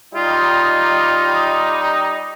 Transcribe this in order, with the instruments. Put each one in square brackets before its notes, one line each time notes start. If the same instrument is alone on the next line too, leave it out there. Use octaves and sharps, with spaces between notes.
[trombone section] G3 D#4 [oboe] F4